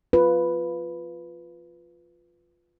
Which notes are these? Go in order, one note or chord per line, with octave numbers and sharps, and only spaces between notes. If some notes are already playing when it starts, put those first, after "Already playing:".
F4 B4